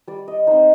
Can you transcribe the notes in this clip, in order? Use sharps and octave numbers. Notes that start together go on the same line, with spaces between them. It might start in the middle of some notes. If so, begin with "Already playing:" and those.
G3 D5
D#5
C4 D#4 C5